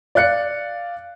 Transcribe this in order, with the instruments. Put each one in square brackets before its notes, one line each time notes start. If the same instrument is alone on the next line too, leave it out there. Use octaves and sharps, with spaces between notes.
[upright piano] D5 F5 F#6 C#7